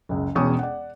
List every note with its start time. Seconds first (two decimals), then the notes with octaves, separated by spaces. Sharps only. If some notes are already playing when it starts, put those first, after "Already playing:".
0.09 F#1 C#2
0.35 E1 E2 B2 C#4 C#6 D#6
0.59 D5 F#5